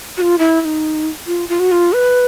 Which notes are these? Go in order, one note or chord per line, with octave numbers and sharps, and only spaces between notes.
F#4
F4
E4
E4
D#4
F4
F4
F#4
F4
B4